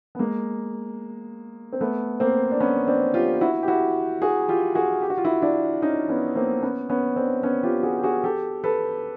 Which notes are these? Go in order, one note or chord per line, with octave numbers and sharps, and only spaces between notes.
B3
G#3 A#3
C4
A3 B3
A#3 C4
D4
B3 C#4
C4 D4
F4 G4
E4 F#4
G4
E4 F#4
F#4 G#4
F4 G4
F#4 G#4
G4
F#4
F4
E4 F#4
D4 E4
C#4 D#4
B3 C#4
A#3 C4
B3 C#4
B3 C#4
C4 D4
B3 C#4
F4 G4
F#4 G#4
G4
F#4 G#4
G4 A4
A4 B4